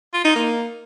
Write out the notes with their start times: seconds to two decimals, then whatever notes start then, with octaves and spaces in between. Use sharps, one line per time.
0.14 F4
0.25 D#4
0.35 A#3